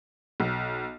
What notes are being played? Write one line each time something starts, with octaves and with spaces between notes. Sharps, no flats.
B1